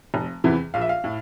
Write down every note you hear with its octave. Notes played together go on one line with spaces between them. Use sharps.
F1
E2 C3 E3
A#1 F5
E5
F5
A2